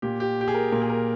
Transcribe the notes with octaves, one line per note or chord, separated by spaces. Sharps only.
A#2 G4
G4
G4
G#4
A#4
A#2 A#4
G#4
A#4